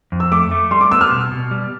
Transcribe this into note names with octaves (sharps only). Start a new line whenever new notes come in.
F2
E6
A3 D6
A3
G3 C6
D6
B3 E6
F6
B2
B2
G3